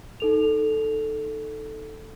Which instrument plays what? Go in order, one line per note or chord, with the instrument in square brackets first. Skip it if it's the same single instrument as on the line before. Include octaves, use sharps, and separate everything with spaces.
[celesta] D#4 A4 F7